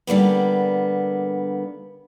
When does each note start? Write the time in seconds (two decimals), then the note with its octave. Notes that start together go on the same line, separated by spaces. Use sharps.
0.07 D3 G3 A#3 B3